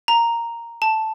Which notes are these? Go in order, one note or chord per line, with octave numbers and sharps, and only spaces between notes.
A#5
A5